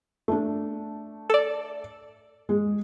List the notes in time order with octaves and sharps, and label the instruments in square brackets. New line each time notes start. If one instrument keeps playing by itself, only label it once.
[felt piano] A3 D4
[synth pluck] A4 D5
[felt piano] G#3